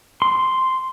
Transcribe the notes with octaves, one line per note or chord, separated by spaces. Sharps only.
C6